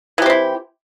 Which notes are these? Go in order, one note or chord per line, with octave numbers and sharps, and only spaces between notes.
E3 C4 E4 G4